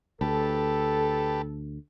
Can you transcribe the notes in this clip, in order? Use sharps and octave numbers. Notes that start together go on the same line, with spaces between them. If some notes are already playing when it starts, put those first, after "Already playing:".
D2 G4 A4 B4 A5